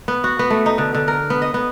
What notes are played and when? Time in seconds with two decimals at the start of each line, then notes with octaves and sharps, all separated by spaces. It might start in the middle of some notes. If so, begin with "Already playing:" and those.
0.08 B3
0.24 F#4
0.39 B3
0.50 A3
0.66 D#4
0.78 D3
0.94 D3
1.08 A#4
1.30 B3
1.42 D#5
1.54 B3